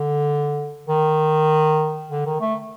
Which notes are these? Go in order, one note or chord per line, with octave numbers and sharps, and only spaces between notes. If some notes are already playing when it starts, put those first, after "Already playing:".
Already playing: D3
D#3
D3
D#3
A3